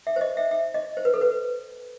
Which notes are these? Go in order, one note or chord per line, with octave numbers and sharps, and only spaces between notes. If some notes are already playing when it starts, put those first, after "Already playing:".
E5
C5
D#5
E5
E5
D#5
C5
B4
A4
B4